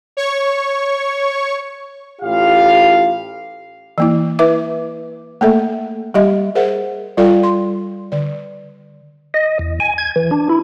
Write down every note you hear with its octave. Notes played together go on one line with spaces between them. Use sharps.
C#5 C#6
A1 A2 F4 G4 F5
E3 A#3 E4
E4 B4 E5 D6
A3 A#3 A4 E5
G3 G4 D#5 E5
G#4 A#4 C5 E5 F#5
G3 F4 A4 D5 F5 G5
C6
D3 D5
D#5
E2
G#5
G#6
E3
D4
E4